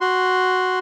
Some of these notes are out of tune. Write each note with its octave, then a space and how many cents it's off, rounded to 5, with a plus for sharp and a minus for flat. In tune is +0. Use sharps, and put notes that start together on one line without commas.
F#4 +0 C6 +0